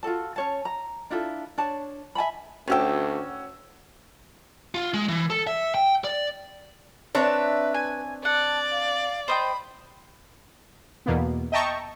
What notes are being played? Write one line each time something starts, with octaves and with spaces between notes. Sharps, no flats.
F4 F#4 A4 A5
C#4 C#5 A5
A#5
D4 E4 F4 A4
D4 C#5 A5
E5 G#5 A5 B5
D2 D#3 C#4 F#4 G4 G5 E6
F4
G#3
E3
A4
E5
G5
D5
C4 D4 B4 C#5 E5
G#5
D5 F#5 A5
F5
C5 D#5 G5 B5
E2 B2 A#3 B3
D#5 E5 G5 A5 A#5 C#6